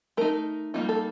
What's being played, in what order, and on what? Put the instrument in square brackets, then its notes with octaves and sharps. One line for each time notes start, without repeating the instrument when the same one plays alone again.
[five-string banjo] A3 D#4 A#4
G3 A#3 D#4 F4
A4